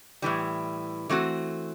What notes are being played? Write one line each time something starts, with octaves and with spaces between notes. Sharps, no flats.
A2 E3 G3
E3 A3 C4 F#4